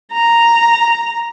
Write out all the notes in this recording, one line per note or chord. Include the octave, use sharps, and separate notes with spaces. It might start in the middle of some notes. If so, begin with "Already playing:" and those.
A#5